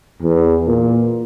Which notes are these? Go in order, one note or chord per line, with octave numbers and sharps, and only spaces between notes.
E2
A#2